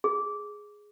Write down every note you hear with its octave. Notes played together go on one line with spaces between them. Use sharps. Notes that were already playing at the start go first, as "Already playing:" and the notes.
G#4